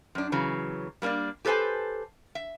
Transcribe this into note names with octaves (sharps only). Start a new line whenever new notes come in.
F#2 D4
C#3 E3 F#3
G3 A#3 C#4 D4 D5
G4 A4 B4 C5 G#5 A5
E5